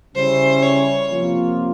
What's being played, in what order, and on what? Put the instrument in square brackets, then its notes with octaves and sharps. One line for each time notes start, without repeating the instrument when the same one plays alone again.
[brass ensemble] C#3 G3 C#4 E4 [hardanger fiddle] C5
[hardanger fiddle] C#5
[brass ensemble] C3 F3 A#3 F4